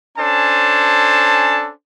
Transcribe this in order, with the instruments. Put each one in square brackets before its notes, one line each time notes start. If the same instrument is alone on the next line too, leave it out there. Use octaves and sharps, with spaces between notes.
[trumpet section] C#4 D4 A4 C5 G#5 A5